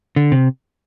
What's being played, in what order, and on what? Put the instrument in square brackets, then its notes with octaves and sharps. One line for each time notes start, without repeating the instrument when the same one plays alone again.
[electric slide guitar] D3
C3